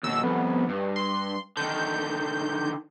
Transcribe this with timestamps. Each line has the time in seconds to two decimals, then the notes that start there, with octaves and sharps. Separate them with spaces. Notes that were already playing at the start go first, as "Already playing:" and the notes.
0.04 D#2 B2 E6
0.24 C2 F2 B3
0.69 G2
0.96 C6
1.57 D3 D#3 G6